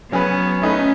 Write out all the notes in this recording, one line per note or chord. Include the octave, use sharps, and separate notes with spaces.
F#3 B3 C#4 G#4 B4
A3 C#4 D#4 G#4 B4